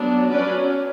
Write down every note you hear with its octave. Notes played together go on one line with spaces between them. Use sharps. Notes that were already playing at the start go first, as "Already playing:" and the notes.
Already playing: F#3 B3 D4
F#3 C#4 B4 D5